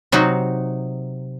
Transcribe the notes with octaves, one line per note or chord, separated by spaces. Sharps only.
C3 F#3 D#4 F#4